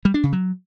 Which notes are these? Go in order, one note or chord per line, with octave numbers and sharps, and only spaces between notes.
G3
D4
C#3
F#3